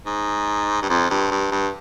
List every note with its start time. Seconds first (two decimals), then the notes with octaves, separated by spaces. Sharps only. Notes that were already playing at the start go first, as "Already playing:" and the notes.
0.06 G#2
0.82 G2
0.90 F2
1.10 G2
1.31 G2
1.52 G2